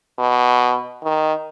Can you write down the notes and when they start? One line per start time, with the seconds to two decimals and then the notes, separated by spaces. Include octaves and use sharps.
0.18 B2
1.03 D#3